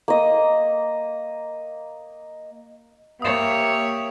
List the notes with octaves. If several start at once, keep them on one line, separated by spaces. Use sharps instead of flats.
A#3 D#5
A#3 G4 C#5 E5 D#6 E7